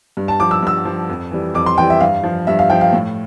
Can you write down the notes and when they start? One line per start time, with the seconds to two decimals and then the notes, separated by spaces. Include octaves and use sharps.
0.17 G2
0.28 A5
0.40 F3 D6
0.51 E6
0.63 G2 E6
0.85 F3
1.09 F2
1.31 E3 G3
1.54 F2 D6
1.66 C6
1.78 E3 G3 G5
1.90 E5
2.01 G2 F5
2.24 F3
2.47 G2 E5
2.59 F5
2.70 F3 G5
2.81 F5
2.93 A2